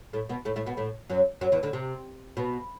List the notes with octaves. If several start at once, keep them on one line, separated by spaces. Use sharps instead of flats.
A2 A3
B2 B3
A2 A3
A2 A3
B2 B3
A2 A3
F#2 F#3
F#2 F#3
E2 E3
D2 D3
C3
B2